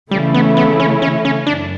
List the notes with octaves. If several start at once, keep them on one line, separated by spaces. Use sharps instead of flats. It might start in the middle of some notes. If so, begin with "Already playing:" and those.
C#3 E3 G3 A3 E4
B3
B3
C#4
C#4
C#4
F#2 D4